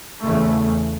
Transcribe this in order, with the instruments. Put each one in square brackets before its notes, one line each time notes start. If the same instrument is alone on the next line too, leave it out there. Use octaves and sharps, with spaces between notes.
[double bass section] E2 C#3 A3